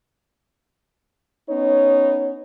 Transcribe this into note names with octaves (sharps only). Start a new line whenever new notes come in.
B3 C#4 D#4 C#5